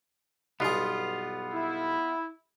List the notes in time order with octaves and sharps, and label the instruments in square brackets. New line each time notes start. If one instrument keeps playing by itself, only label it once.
[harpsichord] B1 G2 G#4 [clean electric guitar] B3 F4
[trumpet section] E4